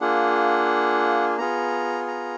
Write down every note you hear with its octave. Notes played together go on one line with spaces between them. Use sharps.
A#3 D4 F4 G#4 F#5
B3 F4 G#4 A#5
A#5